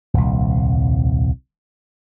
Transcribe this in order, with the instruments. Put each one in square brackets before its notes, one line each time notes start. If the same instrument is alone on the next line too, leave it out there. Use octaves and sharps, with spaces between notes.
[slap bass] D#1 C2